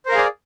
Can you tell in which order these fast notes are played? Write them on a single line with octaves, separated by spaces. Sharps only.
C5 A#4 F5 G#4 D5